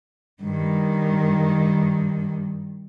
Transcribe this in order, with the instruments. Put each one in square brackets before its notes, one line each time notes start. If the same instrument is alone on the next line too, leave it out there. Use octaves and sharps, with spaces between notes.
[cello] G2 D#3